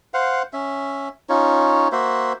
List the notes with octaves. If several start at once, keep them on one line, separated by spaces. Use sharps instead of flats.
C5 F5 F#5
C#4 E5
C#4 D#4 F4 C#5
A#3 F#4 C5 E5